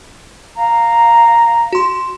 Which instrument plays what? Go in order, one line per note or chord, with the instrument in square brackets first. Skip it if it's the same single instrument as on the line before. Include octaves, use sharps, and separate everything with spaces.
[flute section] F5 A#5
[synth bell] F#4 C6